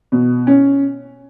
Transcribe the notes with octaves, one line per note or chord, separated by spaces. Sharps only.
B2
C#4